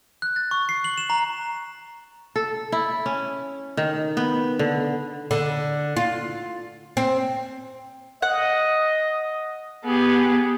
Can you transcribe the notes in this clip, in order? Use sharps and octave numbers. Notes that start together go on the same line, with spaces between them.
F#6
A6
C#6
C7
F#7
E7
A#5
A4
E4
C#4
D#3
B3
D3
D3
F4
C4
D#5 F#5
B3 G4 G#4